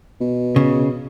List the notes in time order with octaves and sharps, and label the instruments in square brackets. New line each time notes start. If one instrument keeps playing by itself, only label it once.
[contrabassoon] B2
[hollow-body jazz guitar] C#3